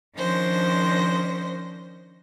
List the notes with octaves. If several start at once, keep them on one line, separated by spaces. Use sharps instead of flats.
D#3 F3 C#4 D4 C5 A#6